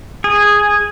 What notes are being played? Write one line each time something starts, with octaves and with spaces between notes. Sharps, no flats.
G#4